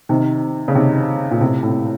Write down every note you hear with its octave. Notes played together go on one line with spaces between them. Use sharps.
C3 D#3
C#3
C3 D#3
A#2
A2 C3
A2 C3